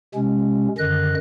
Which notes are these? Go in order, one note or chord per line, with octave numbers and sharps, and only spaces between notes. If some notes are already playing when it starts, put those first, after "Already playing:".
C3 G#3 C#4
F#2 D3 D#3 D#5 F#6